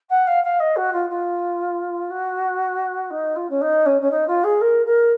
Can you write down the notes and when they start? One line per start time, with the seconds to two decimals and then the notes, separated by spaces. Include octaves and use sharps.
0.09 F#5
0.27 F5
0.43 F5
0.59 D#5
0.76 F#4
0.92 F4
1.09 F4
2.10 F#4
3.10 D#4
3.35 F4
3.49 C#4
3.61 D#4
3.85 C#4
4.01 C#4
4.10 D#4
4.27 F4
4.43 G#4
4.61 A#4
4.85 A#4